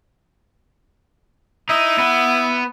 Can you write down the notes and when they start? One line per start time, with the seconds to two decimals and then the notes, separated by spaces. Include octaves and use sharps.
1.69 D#4 E4
1.99 B3